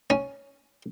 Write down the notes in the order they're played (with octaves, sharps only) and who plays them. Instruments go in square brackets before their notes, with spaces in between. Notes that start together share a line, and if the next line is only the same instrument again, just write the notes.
[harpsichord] C#4